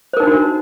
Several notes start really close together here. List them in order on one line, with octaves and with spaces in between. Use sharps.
C5 A#4 D#4 D4 F#4